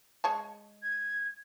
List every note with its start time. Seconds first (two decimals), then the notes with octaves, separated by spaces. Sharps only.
0.24 G#3 C#5 A5
0.82 G#6